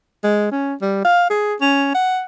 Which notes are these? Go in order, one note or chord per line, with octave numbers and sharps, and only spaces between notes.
G#3
C#4
G3
F5
G#4
C#4
F#5